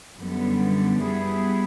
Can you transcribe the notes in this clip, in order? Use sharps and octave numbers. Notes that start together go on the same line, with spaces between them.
F#2 D3 G3 B3
G3 B3 E4 G#4